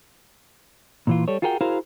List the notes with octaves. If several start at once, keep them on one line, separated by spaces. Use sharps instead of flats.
A#2 E3 F4
G3 A4 C#5
F4 F#4 G#4 A#4 B4 G5
E4 F#4 G#4 A#4 C5 F5